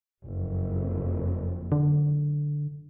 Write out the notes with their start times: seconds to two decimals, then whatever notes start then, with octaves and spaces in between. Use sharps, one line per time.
0.24 F#1 F2
1.72 D3